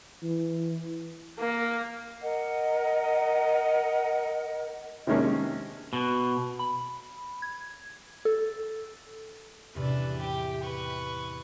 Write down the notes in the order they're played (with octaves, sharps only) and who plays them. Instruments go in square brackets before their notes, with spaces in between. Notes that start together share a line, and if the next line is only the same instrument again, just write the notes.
[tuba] E3
[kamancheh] A#3
[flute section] A#4 D#5 F#5
[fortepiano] C3 D#3 G#3 A#3 C#4 D4
[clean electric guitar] B2
[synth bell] B5
G#6
A4
[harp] E2 A2 C3 [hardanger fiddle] D4 B4
[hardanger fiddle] G4 G5 [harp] E5
[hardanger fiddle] B4 C#6